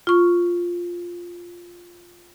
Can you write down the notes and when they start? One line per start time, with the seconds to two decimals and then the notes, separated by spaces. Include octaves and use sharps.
0.07 F4 C#6